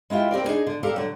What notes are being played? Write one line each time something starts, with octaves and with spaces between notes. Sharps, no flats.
G#3 E4 F4 G4
C4 G4 A#4 D5
B3 D4 D#4 G#4
D3
G4 A4 A#4 D5 F5
D3 F#3